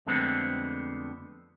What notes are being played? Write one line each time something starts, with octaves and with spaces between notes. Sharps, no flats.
F2 D3 G#3 A3 B3 C4